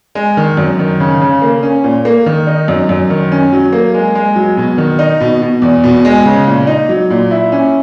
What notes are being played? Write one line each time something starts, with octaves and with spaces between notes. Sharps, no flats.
G#3
D#3
F#2
D#3
C#3
C#3
A#3
C#4
A#2
A#3
D#3
D#4
F#2
F#2
D#3
C#4
F#3
A#3
G#3
G#3
F#3
B2
D#3
D#4
B2
B2
E2
B2
G#3
C#3
A#2
D#4
F#3
A#2
E4
C#4